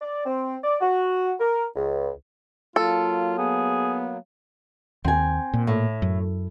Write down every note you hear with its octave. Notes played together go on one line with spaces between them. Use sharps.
D5
C4
D5
F#4
A#4
C#2
F#3 A#3 F4 A4
B3 G#4
D#2 C4 G#5
A#2
A2
F#2